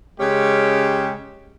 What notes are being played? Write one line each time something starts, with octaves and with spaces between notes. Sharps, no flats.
C#3 G#3 C#4 G4